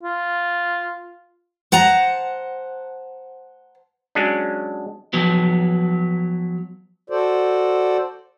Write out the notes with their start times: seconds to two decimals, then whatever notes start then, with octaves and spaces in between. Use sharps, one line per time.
0.03 F4
1.72 C5 F#5 A5 A#5
4.15 F#3 G#3 C#4 D4
5.13 F3 F#3 B3
7.10 F#4 A4 C5 D5